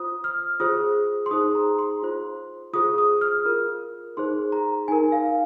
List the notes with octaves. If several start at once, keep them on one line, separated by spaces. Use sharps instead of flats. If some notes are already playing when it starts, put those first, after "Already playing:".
Already playing: F4 C5 D#6
F6
F4 G#4 C5 D#6
C6
D#4 G#4 C5 D#6
A#5
C6
F4 C5
F4 G#4 C5 D#6
D#6
F6
F4 A#4
D#4 G#4 C5 C6
A#5
D#4 A#4 G#5
F5